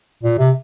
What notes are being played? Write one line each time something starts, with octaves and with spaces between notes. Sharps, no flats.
A#2
C3